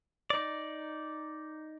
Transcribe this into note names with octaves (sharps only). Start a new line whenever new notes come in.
D#4 D5